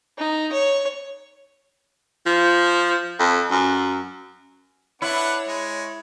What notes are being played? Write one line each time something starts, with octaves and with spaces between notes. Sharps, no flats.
D#4
C#5
F3
F2
F#2
D4 E4 B4 C#5 F#5
G#3